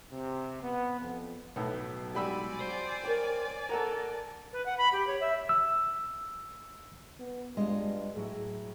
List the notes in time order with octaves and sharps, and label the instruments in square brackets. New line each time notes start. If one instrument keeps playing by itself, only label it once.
[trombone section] C3
B3
F2
[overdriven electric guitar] B1 [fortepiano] A2 B3
[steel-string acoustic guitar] G3 G#3 F#4 [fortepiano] G4 B5 E6 [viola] D5 G#5
[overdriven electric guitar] C5
[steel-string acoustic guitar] A#4 C#5 G5
[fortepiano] A4 F#5 A#5 [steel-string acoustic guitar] A#4
[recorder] B4
F#5
B5
G4
C#5
E5
[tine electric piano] E6
[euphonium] B3
[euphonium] G2 [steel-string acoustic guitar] G#3 F4 D#5
[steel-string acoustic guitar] A2 F#3 E4 [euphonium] G#4